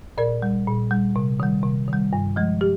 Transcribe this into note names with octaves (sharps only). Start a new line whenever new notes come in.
A#2 A#4 D5
G3
A#2
G3
C3
D#3 G3
C3
D#3
G3
G2
F3 G#3
G4